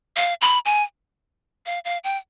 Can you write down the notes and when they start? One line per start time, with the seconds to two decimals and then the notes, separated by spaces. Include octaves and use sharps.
0.16 F5
0.41 B5
0.65 G#5
1.66 F5
1.85 F5
2.04 G5